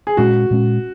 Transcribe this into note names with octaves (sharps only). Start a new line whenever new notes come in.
G#4
A#2 G#3 C#4 F#4
A#2 G#3 C#4